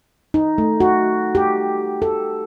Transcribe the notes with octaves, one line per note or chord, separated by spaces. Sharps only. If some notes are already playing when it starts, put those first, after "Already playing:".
D#4
A3
F#4
G4
A4